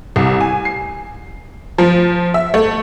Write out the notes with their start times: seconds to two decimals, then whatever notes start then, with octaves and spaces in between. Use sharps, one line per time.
0.16 C2
0.41 G#5
0.65 C7
1.78 F3
2.34 E5
2.54 A3